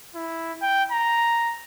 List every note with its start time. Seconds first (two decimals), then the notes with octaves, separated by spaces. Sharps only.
0.15 E4
0.62 G5
0.92 A#5